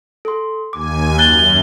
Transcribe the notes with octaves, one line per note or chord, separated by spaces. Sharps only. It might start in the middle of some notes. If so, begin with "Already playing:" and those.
A4 C6
D#2 G#5 D6
F#2 F#6 A6 G7